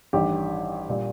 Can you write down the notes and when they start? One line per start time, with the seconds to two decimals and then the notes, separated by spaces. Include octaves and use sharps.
0.13 A1 G2 D#3 G3 G4
0.89 A#2 G3